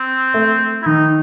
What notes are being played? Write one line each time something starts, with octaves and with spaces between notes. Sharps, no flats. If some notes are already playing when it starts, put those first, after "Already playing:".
Already playing: C4
A3
E4
D#3 D#4